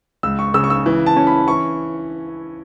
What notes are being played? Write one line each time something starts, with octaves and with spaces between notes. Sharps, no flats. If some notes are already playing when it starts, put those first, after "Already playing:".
C#2 E6
C#6
C#3 E6
C#6
E6
E3
A5
C#4
B5
E3 C#6